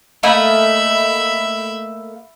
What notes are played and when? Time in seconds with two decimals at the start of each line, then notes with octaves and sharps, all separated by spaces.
0.23 A3 A#3 D#5 E5 B5